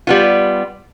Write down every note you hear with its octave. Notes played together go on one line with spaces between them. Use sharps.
G3 B3 F4